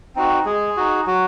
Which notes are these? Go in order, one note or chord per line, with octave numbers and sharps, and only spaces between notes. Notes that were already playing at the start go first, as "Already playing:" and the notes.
C4 D#4 F#4
G#3 G#4
D#4 F#4
F#3 F#4